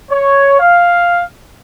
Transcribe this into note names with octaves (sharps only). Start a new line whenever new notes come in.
C#5
F5